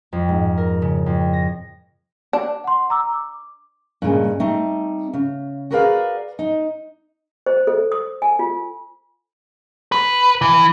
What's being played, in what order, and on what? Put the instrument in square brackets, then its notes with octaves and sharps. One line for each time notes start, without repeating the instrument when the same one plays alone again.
[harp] F2
G#2
A#4
C#3
F2
A#6
[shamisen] D4
[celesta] F#5 C6
A#5 D6 E6
D6
[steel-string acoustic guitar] G2 A#2 C#3 G#3
G3 A3 C4 D#4
C#3
F#4 G#4 A#4 B4 D5 F5
D#4
[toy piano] C5
A4
D#6
G#5
F4
[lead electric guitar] B4
E3